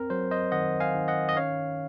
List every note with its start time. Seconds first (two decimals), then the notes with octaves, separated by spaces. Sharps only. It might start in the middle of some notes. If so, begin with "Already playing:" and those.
Already playing: C4 A#4
0.10 F#3 C5
0.31 C5 D#5
0.52 D#3 D#5 F#5
0.80 F5 G#5
0.94 D#3
1.08 D#5 F#5
1.29 D#5
1.36 C#4 C#5 F5